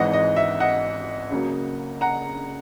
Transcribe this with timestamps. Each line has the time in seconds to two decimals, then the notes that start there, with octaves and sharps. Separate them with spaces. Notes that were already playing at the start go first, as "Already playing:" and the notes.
Already playing: G#1 G#2 E3 G#3 D#5 F#5
0.13 D#5
0.36 E5
0.60 D#5 F#5
1.30 C#2 C#3 F#3 A#3
2.01 F#5 A#5